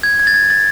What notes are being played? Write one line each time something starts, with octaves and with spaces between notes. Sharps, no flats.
G#6
G#6
A6
G#6
A6